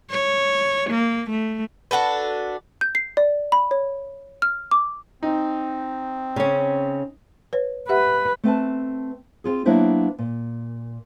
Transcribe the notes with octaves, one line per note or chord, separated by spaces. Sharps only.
C#5
A#3
A3
D4 F#4 A4 B4
G6
C7
D5
B5
C#5
F6
D6
C4 D#4
C#3 C#4
B4 C#5
G4 B4 E5 F#5
A3 C4 B4 A5
C4 C#4 F4 G#4
F#3 A#3 B3 D4 E4 C5
A#2